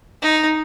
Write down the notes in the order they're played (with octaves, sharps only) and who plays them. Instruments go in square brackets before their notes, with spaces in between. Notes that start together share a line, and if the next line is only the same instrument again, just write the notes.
[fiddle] D#4